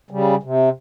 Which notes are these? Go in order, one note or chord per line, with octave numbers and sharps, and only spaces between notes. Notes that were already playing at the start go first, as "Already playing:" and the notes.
C#3 G3
C3